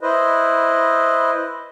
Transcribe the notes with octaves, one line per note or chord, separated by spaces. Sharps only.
E4 B4 C5 D#5